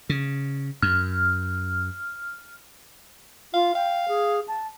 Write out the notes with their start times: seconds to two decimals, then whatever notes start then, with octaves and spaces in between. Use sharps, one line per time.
0.09 C#3
0.82 F#2 F6
3.53 F4 F5
3.75 F5 G5
4.08 G#4
4.48 A5